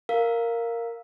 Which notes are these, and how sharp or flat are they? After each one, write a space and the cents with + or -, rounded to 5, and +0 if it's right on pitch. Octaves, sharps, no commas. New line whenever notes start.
A#4 -5 F5 +0